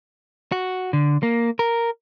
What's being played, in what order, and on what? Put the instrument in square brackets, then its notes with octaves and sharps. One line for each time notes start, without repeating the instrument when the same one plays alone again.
[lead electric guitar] F#4
D3
A#3
A#4